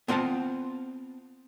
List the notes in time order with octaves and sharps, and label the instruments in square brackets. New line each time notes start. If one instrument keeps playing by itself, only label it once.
[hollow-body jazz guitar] B3 C4 F4 F#5 A5